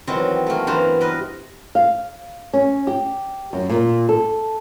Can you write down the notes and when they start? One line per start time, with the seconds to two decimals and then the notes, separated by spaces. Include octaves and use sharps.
0.07 D#3 E3 F#3 C4
0.46 A3 A#3
0.67 G2 E3 A#3 B3 C5 A#5
1.01 A#4 B4 D#5
1.75 F5
2.53 C#4
2.87 G4
3.53 F#2
3.69 A#2
4.09 A4